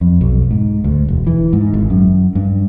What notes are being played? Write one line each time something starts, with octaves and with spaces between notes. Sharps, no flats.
F2
B1
G#2
D2
E1
E3
G#2
G#1
F#2
G2